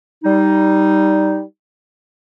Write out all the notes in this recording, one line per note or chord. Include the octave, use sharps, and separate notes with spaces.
G3 D#4